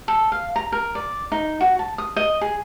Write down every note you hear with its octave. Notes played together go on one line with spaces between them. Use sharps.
A4
F5
A#5
A#4
D5
D#4
F#4
A5
D#6
D#5
G#4